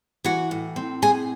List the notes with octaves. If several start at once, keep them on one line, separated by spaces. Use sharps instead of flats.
E3 F#4 F#5
A2
C4
A2 G#4 G#5